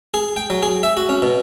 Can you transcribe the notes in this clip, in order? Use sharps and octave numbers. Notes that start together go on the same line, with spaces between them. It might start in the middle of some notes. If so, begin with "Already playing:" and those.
G#4
G5
F#3
G#4
E5
F#4
C#4
B2